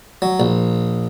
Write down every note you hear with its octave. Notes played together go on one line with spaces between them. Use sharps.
F#3
A#1